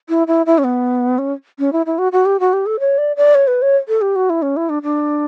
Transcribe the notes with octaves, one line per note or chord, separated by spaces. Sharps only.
E4
E4
E4
C#4
B3
C#4
C#4
E4
E4
F#4
F#4
G4
F#4
G4
A4
C#5
D5
D5
C#5
B4
C#5
A4
G4
F#4
E4
C#4
E4
D4
D4